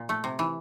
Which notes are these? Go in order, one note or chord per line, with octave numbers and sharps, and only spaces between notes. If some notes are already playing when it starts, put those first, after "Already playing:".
Already playing: A#2
A3
C3
E3